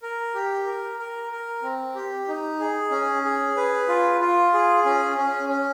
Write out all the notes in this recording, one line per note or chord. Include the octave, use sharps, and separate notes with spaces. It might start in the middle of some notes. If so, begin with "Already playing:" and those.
A#4
G4
A#4
A#4
A#4
C4
G4
D#4
G#4
C#4
G#4
B4
F4
F4
G#4
C#4
C#4
C#4